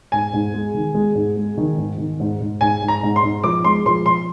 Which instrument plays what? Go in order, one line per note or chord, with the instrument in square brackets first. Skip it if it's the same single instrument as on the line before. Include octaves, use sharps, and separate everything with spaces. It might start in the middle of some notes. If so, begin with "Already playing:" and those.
[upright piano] G#2 [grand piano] G#5
[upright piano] G#2
G#3
D#3
G#3
G#2
G#3
D#3
G#2
D#3
G#2
G#2
[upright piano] G#2 [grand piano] G#5
[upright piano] G#2
[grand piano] A#5
[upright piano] G#2
[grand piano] C6
[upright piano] G#2
[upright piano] F3 [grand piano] D6
[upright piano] G#3 [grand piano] C6
[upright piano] F3 [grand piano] C6
[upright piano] F3 [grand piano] C6